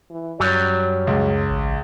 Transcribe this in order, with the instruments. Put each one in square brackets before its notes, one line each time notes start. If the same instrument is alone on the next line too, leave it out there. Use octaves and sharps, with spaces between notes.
[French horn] E3
[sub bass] F#2 [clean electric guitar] F#3 G3 [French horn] C#5
[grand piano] C#2
[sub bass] A1